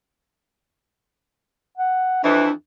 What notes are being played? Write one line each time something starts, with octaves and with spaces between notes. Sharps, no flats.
F#5
F2 E3 D4